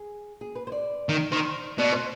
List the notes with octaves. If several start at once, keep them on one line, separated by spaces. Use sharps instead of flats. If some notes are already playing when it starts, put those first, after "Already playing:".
Already playing: G#4
G#4
B4
C5
D5
D#3
D#3 C5
B2 D5
C5